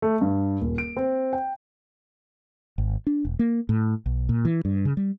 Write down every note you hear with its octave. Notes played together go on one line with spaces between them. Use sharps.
A3
G2
D#1
D7
C4
G5
G#1
D4
E1
A#3
A2
B1
A#2
E3
G2
C#3
G3